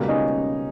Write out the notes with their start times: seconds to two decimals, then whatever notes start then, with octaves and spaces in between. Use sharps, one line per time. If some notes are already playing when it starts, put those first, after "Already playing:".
Already playing: C#2 B2 G3 A#3
0.08 C#4 D#4